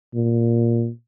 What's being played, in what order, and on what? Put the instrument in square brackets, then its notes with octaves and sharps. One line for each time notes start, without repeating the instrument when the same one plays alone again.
[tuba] A#2